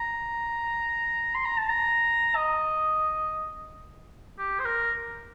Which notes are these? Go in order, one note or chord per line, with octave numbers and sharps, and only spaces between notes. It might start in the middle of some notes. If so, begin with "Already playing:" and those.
Already playing: A#5
C6
A#5
A5
A#5
D#5
G4
C5
A#4